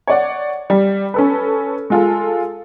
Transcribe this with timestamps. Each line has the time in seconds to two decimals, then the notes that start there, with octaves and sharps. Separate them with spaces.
0.07 C#5 D5 F#5
0.70 G3
1.14 C#4 A4 B4
1.90 G#3 F4 A4